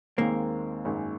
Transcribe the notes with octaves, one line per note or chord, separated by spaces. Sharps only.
D#2 D#3 G#3 A#3 C4
G#1 F#2 D#3 G#3